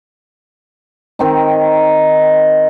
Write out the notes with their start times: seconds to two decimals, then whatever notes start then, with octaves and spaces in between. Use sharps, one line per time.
1.19 D#3 C4 D#4